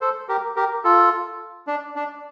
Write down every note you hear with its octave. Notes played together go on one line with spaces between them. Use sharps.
A4 C5
G4 A#4
G4 A#4
F4 A4
D4
D4